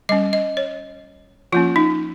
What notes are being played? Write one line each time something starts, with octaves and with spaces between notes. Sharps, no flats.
G3 C#4 D#5
D#5
C#5
F3 A#3 C#4 F4
D#4